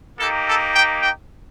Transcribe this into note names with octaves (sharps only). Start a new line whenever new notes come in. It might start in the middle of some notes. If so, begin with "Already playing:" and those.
A#3 D#4 G4 A4
A4
G5
G5